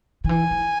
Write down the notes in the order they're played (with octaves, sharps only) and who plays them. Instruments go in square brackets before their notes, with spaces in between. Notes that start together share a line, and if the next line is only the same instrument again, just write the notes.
[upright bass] D#3
[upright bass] E3 [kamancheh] G#5
[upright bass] E3